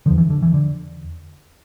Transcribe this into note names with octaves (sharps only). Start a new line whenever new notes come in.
E2 D3 F3
E3
D3
E3
D3